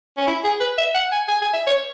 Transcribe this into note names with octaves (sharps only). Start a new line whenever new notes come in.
C#4
E4
G#4
B4
E5
F#5
G#5
G#5
G#5
E5
C#5